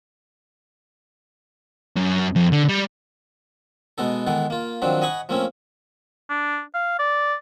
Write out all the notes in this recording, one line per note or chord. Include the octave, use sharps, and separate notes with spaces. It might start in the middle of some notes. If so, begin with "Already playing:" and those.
F#2
F2
D3
G3
B2 G#3 B3 D#4 A4
D#3 E3 G#3 B3 A4
A#3 F4
D#3 F3 F#3 C4 D4
D#5 F#5 G#5 B5 C#6 D#6
F3 A3 A#3 C4 C#4
D4
F5
D5